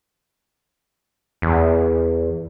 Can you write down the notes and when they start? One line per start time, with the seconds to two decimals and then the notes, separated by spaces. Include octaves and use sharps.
1.42 E2